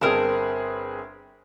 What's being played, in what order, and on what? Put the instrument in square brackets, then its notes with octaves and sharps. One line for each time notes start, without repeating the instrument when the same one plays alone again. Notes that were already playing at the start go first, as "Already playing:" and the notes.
[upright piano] G1 C4 G#4 [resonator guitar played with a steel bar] A#4 A5